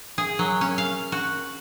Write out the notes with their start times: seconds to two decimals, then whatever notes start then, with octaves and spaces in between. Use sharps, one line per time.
0.18 G#4
0.39 F#3
0.61 C#4
0.78 F5
1.12 F#4